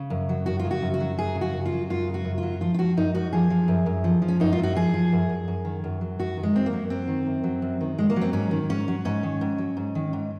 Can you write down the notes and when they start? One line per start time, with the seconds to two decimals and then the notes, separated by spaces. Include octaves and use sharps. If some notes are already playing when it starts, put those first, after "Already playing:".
Already playing: C#3
0.10 F#2
0.29 F#3
0.46 F#2 F#4
0.59 F4
0.65 C#3
0.71 F#4
0.82 F#2
0.94 F#4
1.00 F#3
1.18 F#2 G#4
1.35 C#3
1.41 F#4
1.53 F#2
1.66 F4
1.72 F#3
1.90 F#2 F4
2.08 C#3
2.14 F#4
2.25 F#2
2.38 F4
2.43 F#3
2.61 F3 F4
2.74 F4
2.78 F3 F#4
2.97 F#2 D#4
3.15 F#2 F#4
3.33 F3 G#4
3.50 F3
3.68 F#2
3.86 F#2
4.04 F3
4.22 F3
4.28 C#4
4.40 F#2 D#4
4.53 F4
4.59 F#2 F#4
4.76 F3 G#4
4.94 F3
5.12 F#2
5.29 F#2
5.48 F#2
5.65 D#3
5.84 F#2
6.01 F#3
6.19 F#2 F#4
6.37 D#3
6.43 G#3
6.54 F#2 C4
6.66 A#3
6.73 F#3
6.90 F#2 C4
7.08 D#3
7.26 F#2
7.44 F#3
7.62 F#2
7.81 D#3
7.98 F#2 G#3
8.10 A#3
8.16 F#3
8.21 C4
8.33 G#2 C#4
8.51 D#3
8.69 G#2 C#4
8.88 F#3
9.05 G#2 C#4
9.23 D#3
9.41 G#2
9.58 F#3
9.77 G#2
9.95 D#3
10.13 G#2